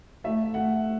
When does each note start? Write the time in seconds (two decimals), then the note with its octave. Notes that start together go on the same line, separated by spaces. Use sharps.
0.24 A3 E5
0.54 A3 F#5